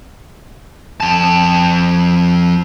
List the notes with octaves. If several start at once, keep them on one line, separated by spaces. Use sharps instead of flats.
F2 A5